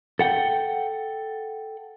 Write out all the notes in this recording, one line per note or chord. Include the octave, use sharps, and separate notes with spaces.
A4 F#5 G5